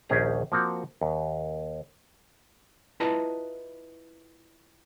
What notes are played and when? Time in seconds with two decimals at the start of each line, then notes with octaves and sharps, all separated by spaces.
0.09 A#1 D#2 C#4 G4 G#4 A#5
0.52 F3 A#3 C4 F#4
1.01 D#2
3.00 E4 F4 B4 D#5 A5 A#5